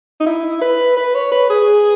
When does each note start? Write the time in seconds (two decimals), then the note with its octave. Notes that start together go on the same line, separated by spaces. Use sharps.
0.20 D#4
0.26 E4
0.62 B4
0.97 B4
1.15 C#5
1.32 B4
1.50 G#4